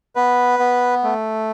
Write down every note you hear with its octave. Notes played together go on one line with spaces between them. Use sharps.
B3 B4
B3
A3